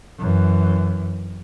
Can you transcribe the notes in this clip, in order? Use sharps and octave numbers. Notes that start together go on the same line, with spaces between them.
F#2 E3